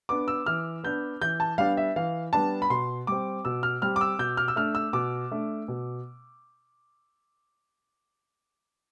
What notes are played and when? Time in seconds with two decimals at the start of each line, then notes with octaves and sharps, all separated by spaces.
0.09 B3 D4 D6
0.28 E6
0.46 E3 F6
0.84 B3 D4 G6
1.21 E3 G6
1.40 A5
1.58 G3 B3 D4 F5
1.77 E5
1.96 E3 F5
2.33 G3 B3 D4 A5
2.62 B5
2.70 B2 C6
3.07 G3 C4 D6
3.45 B2 E6
3.63 F6
3.82 G3 C4 F6
3.96 D6
4.01 E6
4.19 B2 G6
4.37 F6
4.48 E6
4.56 A3 D4 F6
4.75 E6
4.93 B2 D6
5.32 A3 D4
5.68 B2